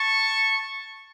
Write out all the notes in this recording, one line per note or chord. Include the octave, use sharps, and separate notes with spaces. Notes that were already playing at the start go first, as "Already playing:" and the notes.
Already playing: A5 C#6